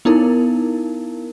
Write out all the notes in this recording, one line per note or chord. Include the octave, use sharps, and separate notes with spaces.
B3 D#4 E4 A#4